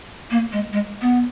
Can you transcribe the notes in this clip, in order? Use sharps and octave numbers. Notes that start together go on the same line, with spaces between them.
A#3
G#3
G#3
B3